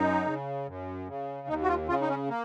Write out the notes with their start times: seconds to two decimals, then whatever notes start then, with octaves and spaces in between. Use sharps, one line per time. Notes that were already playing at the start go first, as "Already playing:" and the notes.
Already playing: F#2 D#4
0.27 C#3
0.68 F#2
1.08 C#3
1.48 D#2 D#4
1.63 F#4
1.69 F4
1.89 C#3 F4
2.01 D#4
2.09 C#4
2.29 A#3